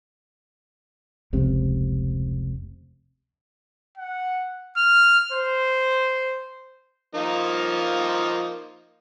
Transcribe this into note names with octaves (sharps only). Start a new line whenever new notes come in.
F1 C#2 C3
F#5
F6
C5
F3 A#3 D#4